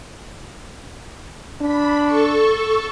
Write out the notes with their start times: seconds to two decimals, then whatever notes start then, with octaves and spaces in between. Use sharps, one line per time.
1.61 D4 B5
2.05 A4 C#6